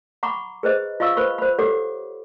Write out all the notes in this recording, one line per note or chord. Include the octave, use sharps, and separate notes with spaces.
F#5 A#5 B5 C#6 D6
G#4 B4 C5 D#5
F4 D#5 F5 C#6 E6
B4 C5 B5 C#6
C5 B5
G4 A4 C#5 F#5 D6